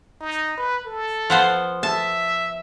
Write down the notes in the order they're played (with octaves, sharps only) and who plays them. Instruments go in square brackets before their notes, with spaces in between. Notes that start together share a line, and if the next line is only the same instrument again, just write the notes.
[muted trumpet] D#4
B4
A4
[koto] F3 B3 C5
[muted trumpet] E5 [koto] A5